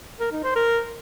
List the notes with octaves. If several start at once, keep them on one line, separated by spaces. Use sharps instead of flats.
A#4
D#4
C5
A#4